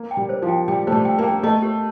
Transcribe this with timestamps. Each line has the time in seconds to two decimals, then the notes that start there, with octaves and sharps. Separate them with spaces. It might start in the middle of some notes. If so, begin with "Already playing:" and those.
Already playing: A#3
0.11 G5
0.17 G3
0.29 C5
0.42 F3
0.48 G5
0.68 G3 G5
0.87 A3 C5
0.92 G3
1.05 G5
1.19 A#3
1.24 G5
1.43 A3 D#5
1.62 G4